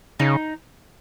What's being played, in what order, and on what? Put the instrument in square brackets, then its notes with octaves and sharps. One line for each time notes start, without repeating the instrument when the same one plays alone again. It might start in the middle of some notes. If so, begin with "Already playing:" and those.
[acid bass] C#3 [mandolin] D#4